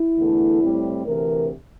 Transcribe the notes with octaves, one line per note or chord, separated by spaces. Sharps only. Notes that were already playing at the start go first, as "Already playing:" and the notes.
Already playing: E4
E2 D3 A3
A2 G3 C4
D2 C3 E3 A#4